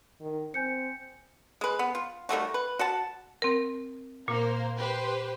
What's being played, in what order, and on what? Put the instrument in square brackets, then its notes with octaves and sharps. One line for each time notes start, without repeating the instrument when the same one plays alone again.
[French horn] D#3
[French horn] C4 [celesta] G#5 G6 C#7
[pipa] G#3 B4
B3
F4
D#3 G3 A3 F#4
B4
F#4 F#5 A5
[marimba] C4 A#4
[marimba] A#2 [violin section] A#3 C5
[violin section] G4 B4 C5